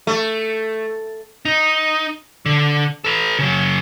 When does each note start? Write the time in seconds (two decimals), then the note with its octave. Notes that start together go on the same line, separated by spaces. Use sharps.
0.07 A3
1.45 D#4
2.46 D3
3.04 A4 B4
3.39 C#3 F#3